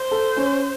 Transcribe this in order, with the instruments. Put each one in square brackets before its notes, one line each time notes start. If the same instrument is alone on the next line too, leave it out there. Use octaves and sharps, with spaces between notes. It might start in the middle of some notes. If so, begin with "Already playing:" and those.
Already playing: [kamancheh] C5
[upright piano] A4
C#4